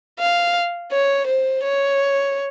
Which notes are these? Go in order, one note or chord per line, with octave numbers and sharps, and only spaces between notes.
F5
C#5
C5
C#5